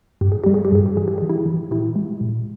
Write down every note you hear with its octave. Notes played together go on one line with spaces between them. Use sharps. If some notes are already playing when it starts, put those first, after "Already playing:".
G2 G4
G#4
G3 G4
G#4
G4
G2 G#4
G4
E3 G#4
G4
E3 G#4
E4 G4
E3
A#2 E4 G4
G#3
A#2